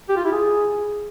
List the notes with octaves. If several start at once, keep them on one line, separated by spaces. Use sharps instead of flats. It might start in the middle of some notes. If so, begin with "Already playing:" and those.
G4
F4
E4
G#4